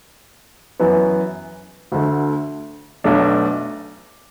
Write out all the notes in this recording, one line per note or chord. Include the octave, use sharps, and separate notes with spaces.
F#2 E3 B3
D2 D3 A3
B1 B2 A3 D4